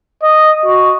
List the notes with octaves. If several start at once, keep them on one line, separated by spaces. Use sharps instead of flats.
D#5
F#4